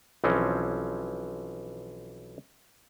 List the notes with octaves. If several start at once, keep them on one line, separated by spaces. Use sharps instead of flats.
B1 E3 F3 C4 C#4